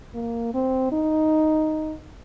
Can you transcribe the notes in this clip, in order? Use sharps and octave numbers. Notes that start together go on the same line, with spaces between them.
A#3
C4
D#4